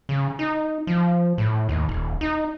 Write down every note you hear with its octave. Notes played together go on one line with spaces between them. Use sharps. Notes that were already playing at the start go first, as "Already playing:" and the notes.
C#3
D#4
F3
A2
D#2
D#1
D#4